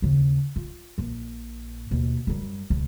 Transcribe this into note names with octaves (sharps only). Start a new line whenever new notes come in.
D#2 C#3
F4
A#1 A#2
D#2 B2
F#2 G3
C#2 B2